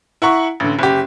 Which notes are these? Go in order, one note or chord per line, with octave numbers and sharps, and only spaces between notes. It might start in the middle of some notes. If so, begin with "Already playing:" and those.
E4 F#5 A#5 C#6
A1 D3
F#1 G4